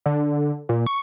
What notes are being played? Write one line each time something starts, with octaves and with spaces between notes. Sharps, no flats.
D3
A#2
C#6